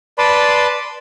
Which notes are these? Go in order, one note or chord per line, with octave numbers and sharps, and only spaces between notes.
B4 D5 A5 B5 C6